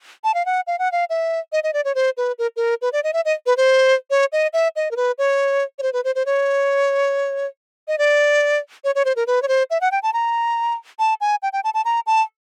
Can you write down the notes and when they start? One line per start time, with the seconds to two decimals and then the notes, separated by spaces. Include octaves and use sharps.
0.24 A5
0.34 F5
0.46 F#5
0.67 F5
0.79 F#5
0.92 F5
1.10 E5
1.52 D#5
1.64 D#5
1.74 D5
1.85 C#5
1.95 C5
2.17 B4
2.39 A#4
2.56 A#4
2.82 B4
2.93 D5
3.04 D#5
3.13 E5
3.25 D#5
3.46 B4
3.57 C5
4.10 C#5
4.32 D#5
4.53 E5
4.76 D#5
4.91 A#4
4.97 B4
5.18 C#5
5.79 C#5
5.82 C5
5.93 B4
6.04 C5
6.15 C5
6.26 C#5
7.88 D#5
7.98 D5
8.84 C#5
8.95 C#5
9.05 C5
9.16 A#4
9.27 B4
9.42 C#5
9.48 C5
9.70 E5
9.81 F#5
9.92 G5
10.03 A5
10.13 A#5
10.99 A5
11.21 G#5
11.43 G5
11.53 G5
11.64 A5
11.74 A5
11.85 A#5
12.07 A5